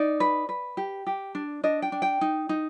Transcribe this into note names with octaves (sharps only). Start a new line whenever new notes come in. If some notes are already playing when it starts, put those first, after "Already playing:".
Already playing: D#4 D5
B4
B4
G4
G4
D4
D4 D#5
G5
D4
G5
D#4
D#4